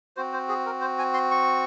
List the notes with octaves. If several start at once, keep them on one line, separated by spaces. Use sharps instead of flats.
C4 F#4 C5
C5
G#4
A#4
C5
G#5
C6
C#6